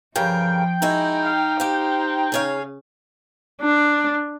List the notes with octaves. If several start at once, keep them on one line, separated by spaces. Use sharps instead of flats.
G2 C#3 F3 A#4 G5
G#3 D#4 E4 F#4
F5
G4 C5 F5
C#3 G#4 C#5 F5
D4